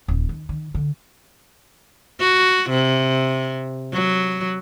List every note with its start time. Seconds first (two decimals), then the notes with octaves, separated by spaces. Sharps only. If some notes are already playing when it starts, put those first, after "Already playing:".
0.08 D#1
0.29 D#2
0.49 D#3
0.74 D3
2.20 F#4
2.70 C3
3.93 F#3